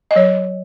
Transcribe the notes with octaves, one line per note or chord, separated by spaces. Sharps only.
D#5
F#3 C#5